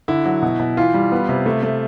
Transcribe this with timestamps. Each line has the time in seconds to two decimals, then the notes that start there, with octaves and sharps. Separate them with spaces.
0.08 D3 E4
0.25 F#3
0.42 B2
0.60 B2
0.77 E3 F4
0.94 G3
1.12 B3
1.29 C3
1.46 A3
1.63 A3